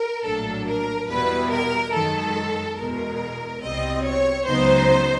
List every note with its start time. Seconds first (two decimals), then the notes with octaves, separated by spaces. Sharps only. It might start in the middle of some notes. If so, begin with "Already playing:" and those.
Already playing: A#4
0.24 A#1 A2 F#3 A#3 D4 A4
0.66 A#4
1.08 E2 B2 G3 B3 E4 B4
1.51 A#4
1.93 F#2 D#3 G#3 A4
2.77 E2 B2 G#3 A#4
3.62 C2 B2 G3 C4 D#5
4.03 C#5
4.46 C#2 C#3 F#3 B3 D#4 C5